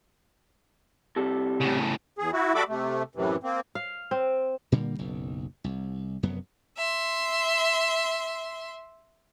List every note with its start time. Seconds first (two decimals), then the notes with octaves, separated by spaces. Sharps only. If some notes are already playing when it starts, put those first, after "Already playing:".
1.16 C3 G3 A4
1.60 A2 C#3
2.18 E2 G#4
2.33 E4 F#4
2.55 G3 F#4 A4 E5 B5 D6
2.68 C3 A3
3.15 F#2 A2 C3 E3
3.43 A#3 C4
3.75 F5
4.11 C4
4.72 A#2 D3 G3 A#3
4.98 F#1 B1
5.64 C2
6.23 F1 F#2 F#3 B3
6.77 E5 C6